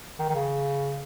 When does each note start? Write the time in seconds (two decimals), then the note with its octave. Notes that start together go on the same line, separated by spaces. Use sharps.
0.19 D#3
0.29 D#3
0.35 C#3